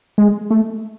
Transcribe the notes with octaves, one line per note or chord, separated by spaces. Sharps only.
G#3
A3